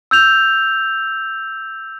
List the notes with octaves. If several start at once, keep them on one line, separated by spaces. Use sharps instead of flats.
E6 G6 F7